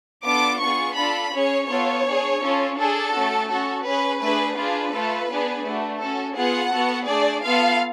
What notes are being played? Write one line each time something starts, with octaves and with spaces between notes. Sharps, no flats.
B3 D4 F4 A4 D6
B3 F4 G#4 C#6
D4 F4 A4 B5
C#4 G#4 C#5
B3 F4 A4 C#5
D4 G#4
C#4 F4 A4
D4 G#4 A4
A3 C#4 F#4
C#4 F#4 A4
C#4 G#4 B4
A3 D4 G#4 B4
D4 F4 G#4 B4
A3 F4 A4
B3 D4 G#4
A3 D4 F#4
C#4 F#4 A4
B3 F4 G#4 F#5
B3 F#4 A4
A3 D4 G#4 D5
B3 F4 A4 F5